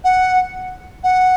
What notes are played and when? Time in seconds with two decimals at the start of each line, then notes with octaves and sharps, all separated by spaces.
0.04 F#5
1.04 F#5